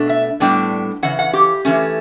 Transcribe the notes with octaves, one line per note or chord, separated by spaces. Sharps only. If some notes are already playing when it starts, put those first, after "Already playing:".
Already playing: B2 A3 D4
E5
A2 G3 B3 D4 G5
C#3 E3 F#5
F#5
G4
E3 A3 C#4